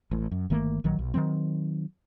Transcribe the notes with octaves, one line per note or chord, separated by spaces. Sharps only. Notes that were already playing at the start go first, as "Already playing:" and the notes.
A1 A2
F#2
G1 D#3 A3 A#3
A#1 D#3 F#3
B1
D#3 F3 F#3 C4